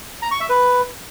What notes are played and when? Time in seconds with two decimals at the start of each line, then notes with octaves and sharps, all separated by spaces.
0.22 A#5
0.31 C#6
0.40 E5
0.49 B4